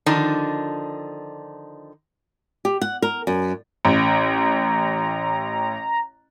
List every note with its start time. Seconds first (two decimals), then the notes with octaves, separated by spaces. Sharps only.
0.06 D3 D#3 F3 D4 D#4
2.65 G4
2.81 F#5
3.02 A#4
3.27 F#2
3.85 A1 A#5